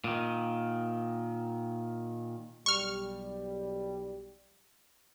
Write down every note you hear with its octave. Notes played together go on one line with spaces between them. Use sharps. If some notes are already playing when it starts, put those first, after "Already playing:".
A#2 D#3
B1 G3 C#6 F6